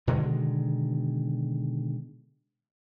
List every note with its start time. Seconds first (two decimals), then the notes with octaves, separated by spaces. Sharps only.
0.07 B2 D3 D#3 G#3